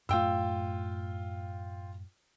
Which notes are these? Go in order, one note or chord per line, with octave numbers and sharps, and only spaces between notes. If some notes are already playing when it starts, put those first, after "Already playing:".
F#2 A2 A3 F4 G5 E6